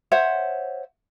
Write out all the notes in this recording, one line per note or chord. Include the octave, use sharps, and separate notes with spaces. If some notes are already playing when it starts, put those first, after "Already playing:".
C5 C#5 E5 F#5